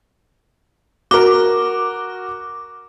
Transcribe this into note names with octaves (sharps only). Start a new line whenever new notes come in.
F#4 A#4 D6